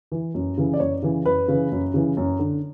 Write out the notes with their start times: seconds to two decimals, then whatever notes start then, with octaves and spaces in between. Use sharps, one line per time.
0.12 E3
0.35 F#2
0.58 C#3 E3
0.74 D5
0.80 F#2 C#5
1.02 C#3 E3
1.26 F#2 B4
1.48 C#3 E3
1.72 F#2
1.94 C#3 E3
2.17 F#2
2.39 D3